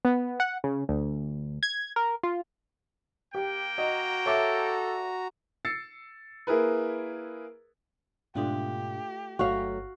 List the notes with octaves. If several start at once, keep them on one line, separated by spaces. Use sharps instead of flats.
B3
F#5
C#3
D2
G#6
A#4
F4
A#3 G4 G5
F#4 D#5 A#5
A4 C#5 E5 D6
E6 A6 C7 C#7
A#3 E4 G#4 A#4 B4
G#2 B2 A3 D4 F4 G4
G1 F#3 A3 F#4 C#5 F5